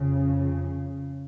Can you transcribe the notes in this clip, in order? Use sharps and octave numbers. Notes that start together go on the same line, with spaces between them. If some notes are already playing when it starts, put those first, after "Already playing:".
Already playing: F2 C#3